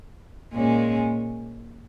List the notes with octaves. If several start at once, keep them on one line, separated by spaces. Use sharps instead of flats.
A#2 G#3 C#4